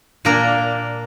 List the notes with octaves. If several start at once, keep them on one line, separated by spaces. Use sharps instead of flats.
A#2 A#3 D4 A#4